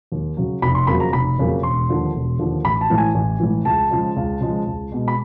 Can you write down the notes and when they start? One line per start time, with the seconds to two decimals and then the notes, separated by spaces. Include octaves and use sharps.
0.12 D#2
0.37 C#3 F#3
0.62 F1 B5
0.75 C6
0.87 F2 C#3 F#3 A#3 B5
1.00 A#5
1.13 F1 B5
1.38 F2 C#3 F#3 A#3
1.63 E1 C6
1.89 D#2 D3 F3
2.14 E1
2.39 D#2 D3 F3
2.64 A1 B5
2.81 A5
2.90 A2 E3
2.98 G#5
3.14 A1 G#5
3.40 A2 E3
3.65 C#2 A5
3.90 C#3 F3 G#3
4.16 C#2
4.41 C#3 F3 G#3
4.66 C#2
4.92 B2 G#3
5.08 B5